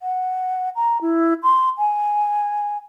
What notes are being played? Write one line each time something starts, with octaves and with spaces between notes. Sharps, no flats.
F#5
A#5
E4
C6
G#5